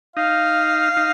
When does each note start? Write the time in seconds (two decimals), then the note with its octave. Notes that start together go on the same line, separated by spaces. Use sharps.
0.16 D#4 F5
0.97 D#4